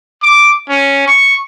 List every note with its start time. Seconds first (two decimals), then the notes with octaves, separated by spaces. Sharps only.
0.22 D6
0.69 C#4
1.07 C#6